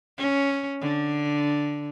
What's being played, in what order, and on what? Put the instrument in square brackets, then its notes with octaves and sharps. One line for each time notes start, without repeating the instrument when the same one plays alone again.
[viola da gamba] C#4
D3